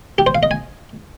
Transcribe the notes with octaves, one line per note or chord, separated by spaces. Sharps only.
G4
C5
F5
D#5
G#5